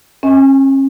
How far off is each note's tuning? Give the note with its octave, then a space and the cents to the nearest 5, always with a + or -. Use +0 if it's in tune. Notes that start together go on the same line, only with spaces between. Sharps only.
C#4 -40 D#5 +40 G#5 +0